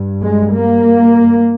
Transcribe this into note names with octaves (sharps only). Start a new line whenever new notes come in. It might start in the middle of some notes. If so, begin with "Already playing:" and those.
Already playing: G2
G#3
A#3